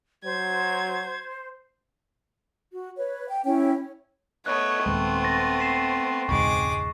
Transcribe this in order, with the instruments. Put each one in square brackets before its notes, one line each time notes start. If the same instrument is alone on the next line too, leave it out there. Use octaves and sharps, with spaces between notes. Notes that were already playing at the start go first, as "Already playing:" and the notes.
[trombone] F#3 [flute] C5 [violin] G#6
[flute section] F#4
B4 C#5
G5
C#4 E4 C#5 G5
C#5
[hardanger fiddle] A3 B3 [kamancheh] C#5 D#5 [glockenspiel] C#6 F#6
[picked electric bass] D#1 D#2 G#3 [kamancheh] C4
[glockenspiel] A6 A#6 D#7
B6 C7 E7
[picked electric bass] E1 C#2 G#2 [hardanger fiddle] G#3 D6 [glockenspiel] C#6